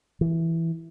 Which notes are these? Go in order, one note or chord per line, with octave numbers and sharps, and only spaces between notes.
E3